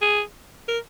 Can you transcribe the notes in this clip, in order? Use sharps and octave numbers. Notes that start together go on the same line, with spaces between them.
G#4
A#4